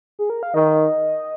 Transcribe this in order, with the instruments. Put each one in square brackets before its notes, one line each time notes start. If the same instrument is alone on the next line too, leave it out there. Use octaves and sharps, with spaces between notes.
[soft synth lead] G#4
A#4
F5
[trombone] D#3 [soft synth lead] D#5